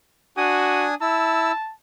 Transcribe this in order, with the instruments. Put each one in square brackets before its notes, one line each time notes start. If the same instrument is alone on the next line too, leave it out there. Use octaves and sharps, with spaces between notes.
[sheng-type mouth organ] D4 G#5 D#6 [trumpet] F#4
[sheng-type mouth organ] E4 E6 [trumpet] A5